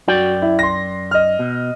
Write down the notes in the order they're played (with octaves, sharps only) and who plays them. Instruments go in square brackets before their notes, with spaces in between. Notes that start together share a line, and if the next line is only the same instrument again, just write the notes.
[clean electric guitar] F#2 D5 G5 [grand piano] F#4
[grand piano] E4
C6 A#6
D#5 F6
[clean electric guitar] B2